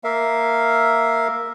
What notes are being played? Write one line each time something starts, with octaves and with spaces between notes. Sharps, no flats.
A#3 A#4 E5 F5